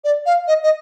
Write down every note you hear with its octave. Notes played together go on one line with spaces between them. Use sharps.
D5
F5
D#5
D#5